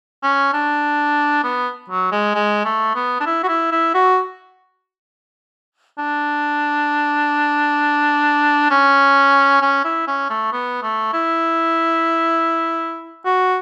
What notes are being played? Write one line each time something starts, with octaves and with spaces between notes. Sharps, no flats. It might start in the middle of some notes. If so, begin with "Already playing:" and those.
C#4
D4
B3
F#3
G#3
G#3
A3
B3
D4
E4
F#4
E4
E4
F#4
D4
C#4
C#4
E4
C#4
A3
B3
A3
E4
F#4